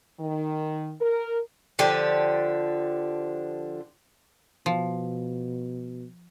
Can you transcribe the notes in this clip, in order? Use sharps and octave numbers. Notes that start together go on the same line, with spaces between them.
D#3
A#4
D3 F3 G4
B2 F3